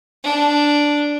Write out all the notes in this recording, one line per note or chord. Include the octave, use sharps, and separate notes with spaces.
D4